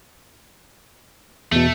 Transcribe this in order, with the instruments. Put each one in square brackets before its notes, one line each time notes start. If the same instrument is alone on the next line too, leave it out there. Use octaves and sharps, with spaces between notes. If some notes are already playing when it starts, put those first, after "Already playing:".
[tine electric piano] E2 B2 [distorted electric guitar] A3